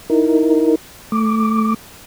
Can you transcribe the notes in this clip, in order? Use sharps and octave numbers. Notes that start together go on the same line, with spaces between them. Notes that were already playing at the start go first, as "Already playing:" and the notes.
D#4 E4 A#4
A3 D6